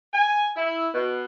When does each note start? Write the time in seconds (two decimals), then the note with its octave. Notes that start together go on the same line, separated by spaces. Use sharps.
0.13 G#5
0.56 E4
0.94 B2